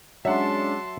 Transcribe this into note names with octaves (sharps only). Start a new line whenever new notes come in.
F#3 G#3 C#4 D4 E5 F#5 A5 C6